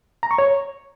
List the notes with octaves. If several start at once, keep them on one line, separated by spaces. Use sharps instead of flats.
A#5
C#6
C#5